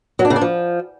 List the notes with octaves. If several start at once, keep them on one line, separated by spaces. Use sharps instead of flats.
F#3
D4
C#3
D4
F3